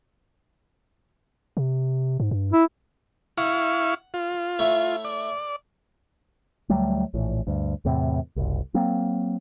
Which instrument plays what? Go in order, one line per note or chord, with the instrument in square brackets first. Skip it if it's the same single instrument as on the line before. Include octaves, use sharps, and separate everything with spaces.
[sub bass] C3
G#2
G2
[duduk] E4
[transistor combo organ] E4 F5 C#6 [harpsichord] F#5
[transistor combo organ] F4
[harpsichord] A3 E4 C#5
[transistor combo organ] D5
[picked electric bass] D2 F#3 G3 A3
A#1 A2 E3
D2 G2
E2 A2 C3
F#1 C2
F#3 A#3 C4